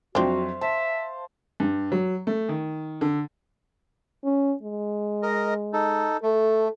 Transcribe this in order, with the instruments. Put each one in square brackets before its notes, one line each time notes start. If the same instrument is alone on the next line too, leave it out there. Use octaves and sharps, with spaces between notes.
[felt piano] F2 F#3 [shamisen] C4 D4 [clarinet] F#4 [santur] C5 E5 F5
[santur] C5 [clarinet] E5 [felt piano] A5
[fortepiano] G2
F#3
A3
D#3
D3
[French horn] C#4
G#3
[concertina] A#4 D#5
D#4 A4
[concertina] A3 [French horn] A4